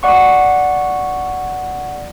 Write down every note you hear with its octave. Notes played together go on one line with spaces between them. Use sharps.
D5 F#5 C#6